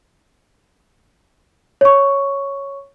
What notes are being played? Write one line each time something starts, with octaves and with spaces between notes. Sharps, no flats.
C#5 C#6